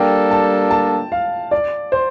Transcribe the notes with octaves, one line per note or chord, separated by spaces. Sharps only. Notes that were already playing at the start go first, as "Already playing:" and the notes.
Already playing: G3 A#3 D4 A4 G5
A5
A5
F5
D5
C5